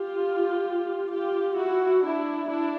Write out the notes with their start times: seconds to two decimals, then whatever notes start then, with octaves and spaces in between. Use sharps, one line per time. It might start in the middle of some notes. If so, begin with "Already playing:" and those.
Already playing: F4 G4
1.11 F4 G4
1.57 E4 F#4
2.03 D4 E4
2.48 D4 E4